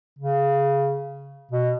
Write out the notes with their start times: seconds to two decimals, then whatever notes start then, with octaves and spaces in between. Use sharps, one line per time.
0.19 C#3
1.51 B2